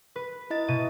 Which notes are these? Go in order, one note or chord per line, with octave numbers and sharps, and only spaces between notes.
B4
E4 D#5 A6
B2 E5 D#7